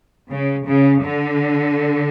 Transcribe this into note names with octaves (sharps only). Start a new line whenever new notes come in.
C#3
C#3
D3